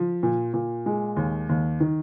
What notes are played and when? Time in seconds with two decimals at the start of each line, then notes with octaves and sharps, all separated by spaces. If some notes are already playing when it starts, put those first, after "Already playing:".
Already playing: F3
0.23 A#2
0.54 A#2
0.86 G#3
1.17 D#2
1.49 D#2
1.80 D#3